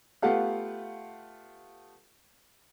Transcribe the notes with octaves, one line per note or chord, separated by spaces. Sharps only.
A3 B3 F4 G4 F5 F#5